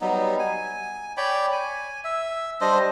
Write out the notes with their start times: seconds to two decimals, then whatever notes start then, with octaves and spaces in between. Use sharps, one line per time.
0.01 F#3 G3 B3 D#4
0.39 G#5
1.17 C#5 D5 G5 B5
1.52 G#5
2.04 E5
2.61 G3 D4 C5 D#5